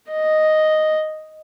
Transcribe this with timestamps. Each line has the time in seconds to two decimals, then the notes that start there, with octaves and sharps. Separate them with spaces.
0.11 D#5